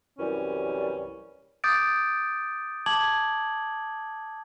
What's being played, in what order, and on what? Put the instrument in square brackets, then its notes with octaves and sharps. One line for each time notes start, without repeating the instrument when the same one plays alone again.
[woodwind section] C2 F#2 E3 G3 C#4
[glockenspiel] D6 D#6 G6 A6 D7
A5 D6 G#6 F#7